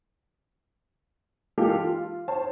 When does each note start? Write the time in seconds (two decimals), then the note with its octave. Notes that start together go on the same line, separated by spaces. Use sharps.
1.58 E3 G#3 A#3 F4 G4 A4
1.85 F4
2.28 C5 C#5 A5